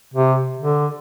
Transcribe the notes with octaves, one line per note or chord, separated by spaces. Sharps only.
C3
D3